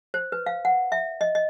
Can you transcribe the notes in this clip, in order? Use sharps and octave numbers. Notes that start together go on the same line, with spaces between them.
C5
B4
F5
F#5
E5
D#5
D#5